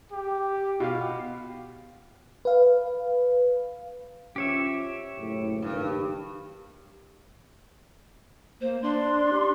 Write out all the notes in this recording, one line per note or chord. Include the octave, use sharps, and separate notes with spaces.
G4
B2 F4 F5
B4 F5
F3 C#4 G4 C#5 E5
F#1 A2
G2 D#3
A#3 C5
D4 C6
G4